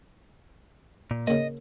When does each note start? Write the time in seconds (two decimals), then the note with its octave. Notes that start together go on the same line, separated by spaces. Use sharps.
1.11 A#2
1.27 C#3 A#3 D#5